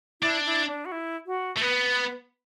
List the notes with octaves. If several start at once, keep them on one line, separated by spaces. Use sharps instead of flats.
D4 E4
E4
D4
F#4
E4
F#4
A3
B3 B4